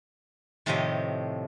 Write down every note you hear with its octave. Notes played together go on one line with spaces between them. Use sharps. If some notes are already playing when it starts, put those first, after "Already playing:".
A2 C3 D#3 F3 G4 D#5